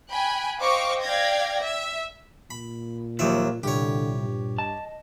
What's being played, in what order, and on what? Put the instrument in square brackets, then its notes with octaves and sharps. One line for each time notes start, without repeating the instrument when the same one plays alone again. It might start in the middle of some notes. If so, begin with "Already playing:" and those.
[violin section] G5 G#5 B5 F#6
C5 D#5 F5 G5 C#6 D6
D5 F5 G5 G6 G#6 A#6
E5
[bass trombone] A#2 [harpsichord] B5
[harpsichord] D#2 F#3 E5 [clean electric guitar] D#3 F3
[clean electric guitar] C2 [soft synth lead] A#2 [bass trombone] D3 [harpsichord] G4 C#5
[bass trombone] G2
[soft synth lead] D#5 [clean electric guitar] A5